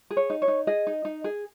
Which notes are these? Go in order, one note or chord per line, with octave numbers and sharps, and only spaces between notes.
G#4
C#5
D#4
C#5
D#4
G#4 D#5
D#4
D#4
G#4